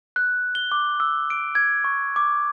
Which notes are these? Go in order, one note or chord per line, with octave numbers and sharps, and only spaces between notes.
F#6
G7
D6
E6
D7
G#6
C#6
D6